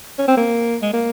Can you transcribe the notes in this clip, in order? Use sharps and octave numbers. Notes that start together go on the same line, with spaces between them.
C#4
C4
A#3
G#3
A#3